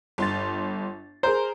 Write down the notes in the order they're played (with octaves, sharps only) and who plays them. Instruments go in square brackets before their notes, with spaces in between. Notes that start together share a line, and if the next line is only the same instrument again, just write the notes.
[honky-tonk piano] G1 C6 A6
[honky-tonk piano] G#4 A#4 A#5 [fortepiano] C5